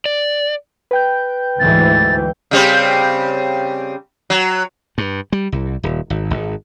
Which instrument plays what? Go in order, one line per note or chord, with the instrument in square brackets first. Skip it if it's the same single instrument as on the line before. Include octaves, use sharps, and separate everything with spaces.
[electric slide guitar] D5
[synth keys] B4 G5 G6
[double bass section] D2 G#2 E3 [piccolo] A6
[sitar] C#3 G3 C4
F#3
[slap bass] G2
G3
C2
D#1
G#1
G#1